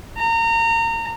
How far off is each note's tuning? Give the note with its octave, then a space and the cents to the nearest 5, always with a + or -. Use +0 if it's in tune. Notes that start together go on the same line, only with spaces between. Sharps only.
A#5 -30